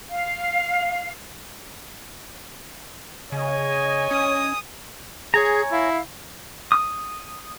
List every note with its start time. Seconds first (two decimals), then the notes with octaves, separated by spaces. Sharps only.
0.09 F5
3.32 C#3 C#5 D#5 G#5
4.11 C#4 D#6
5.34 G#4 C#5 G#5 A#5
5.72 E4 F5
6.72 D#6